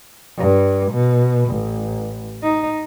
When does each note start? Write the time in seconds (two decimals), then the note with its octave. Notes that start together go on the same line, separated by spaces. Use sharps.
0.38 G2
0.92 B2
1.50 A1
2.43 D#4